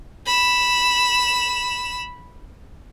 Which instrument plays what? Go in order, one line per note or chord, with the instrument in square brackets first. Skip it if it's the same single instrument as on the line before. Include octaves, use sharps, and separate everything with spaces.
[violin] B5 E7